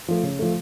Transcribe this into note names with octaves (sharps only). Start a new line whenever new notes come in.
F3 A3
C#3
F3 A3